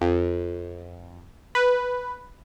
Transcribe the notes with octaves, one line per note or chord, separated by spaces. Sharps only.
F2
B4